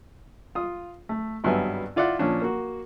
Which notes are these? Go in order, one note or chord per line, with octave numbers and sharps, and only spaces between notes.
F4 D#6
A3
G#1 G2 F#3 B3 E5 G#5
E4 F4 D5 E5 F#5
A#2 F3 C#4 D4
A#3 F#4